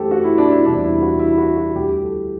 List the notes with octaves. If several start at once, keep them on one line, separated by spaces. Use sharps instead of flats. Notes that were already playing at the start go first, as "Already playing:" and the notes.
Already playing: F#2 E3 A3 G4 A4 C5
F#4
E4
D4
E4
E2 C3 G3 D4
E4
F#4
E4
F#4
F#4
D2 D3 G3 G4
A4